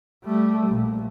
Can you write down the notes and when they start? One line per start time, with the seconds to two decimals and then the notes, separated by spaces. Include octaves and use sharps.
0.24 G3 A3
0.67 A#1 A#2